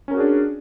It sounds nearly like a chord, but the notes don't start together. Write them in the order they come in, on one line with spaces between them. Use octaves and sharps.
C#4 A#4 F#4 G#4 D4